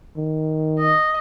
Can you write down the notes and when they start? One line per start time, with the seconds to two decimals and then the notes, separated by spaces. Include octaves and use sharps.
0.17 D#3
0.80 D#5